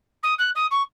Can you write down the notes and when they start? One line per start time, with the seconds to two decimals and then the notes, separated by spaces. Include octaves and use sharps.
0.23 D#6
0.38 F#6
0.55 D#6
0.71 C#6